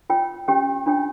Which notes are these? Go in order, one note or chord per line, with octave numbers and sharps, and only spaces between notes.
F4 C#5 G5
C#4 G4 C#5 G5
D4 F4 C#5 G5